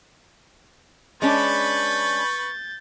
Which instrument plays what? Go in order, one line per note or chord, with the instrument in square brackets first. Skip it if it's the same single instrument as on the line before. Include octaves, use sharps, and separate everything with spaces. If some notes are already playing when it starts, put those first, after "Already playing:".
[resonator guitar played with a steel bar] G#3 C#4 D4 [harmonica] B4 B5 C#6 [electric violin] G6 A6